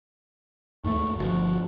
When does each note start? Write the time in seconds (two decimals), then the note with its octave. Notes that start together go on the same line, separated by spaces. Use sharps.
0.84 D#2 G#2 A3 C#6
1.17 G1 C3 F3 F#4